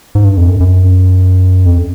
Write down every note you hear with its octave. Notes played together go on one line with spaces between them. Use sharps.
G#2
G2
F2
F#2
F#2
F2